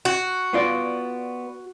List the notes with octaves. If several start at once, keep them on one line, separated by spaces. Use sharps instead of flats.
F#4
B3 F4 D5